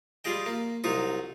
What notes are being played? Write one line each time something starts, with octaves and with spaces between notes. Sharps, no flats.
G3 F4 G#4 D#5 G5
A#3
C2 F#3 D#4 F4 D#6